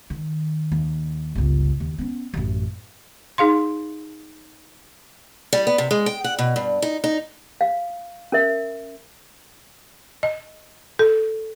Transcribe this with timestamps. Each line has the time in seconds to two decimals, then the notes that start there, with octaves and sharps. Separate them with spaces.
0.10 D#3
0.72 D#2
1.35 G1 C#2
1.80 D#2
1.98 B3 C#4
2.34 A1 F#2
3.38 D#4 G#4 F5 C6
5.53 G3
5.67 B3
5.78 C3
5.91 G#3
6.06 G5
6.24 F#5
6.39 B2
6.56 G2
6.82 D#4
7.04 D#4
7.61 F5
8.32 C#4 A#4 E5
10.23 D#5
10.99 A4